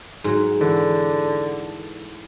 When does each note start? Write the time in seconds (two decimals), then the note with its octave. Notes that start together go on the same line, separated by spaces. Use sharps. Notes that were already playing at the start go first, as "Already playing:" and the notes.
0.24 G#2 F#3
0.61 D3 E3